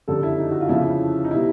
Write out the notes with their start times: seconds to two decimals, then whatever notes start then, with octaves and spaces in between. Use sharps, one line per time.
0.08 F#1 F2 D3 G3 A4
0.23 E4
0.38 D#4
0.51 F#4
0.61 F4
0.69 F2 C#3 F3 E4
1.24 D#4
1.31 B2 G3 E4